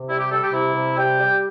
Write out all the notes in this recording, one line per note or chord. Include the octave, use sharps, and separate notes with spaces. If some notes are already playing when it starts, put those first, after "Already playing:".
Already playing: C3
G3 E4
G4
G3 A4
G4
C3 E4
C3
G3 G5
G3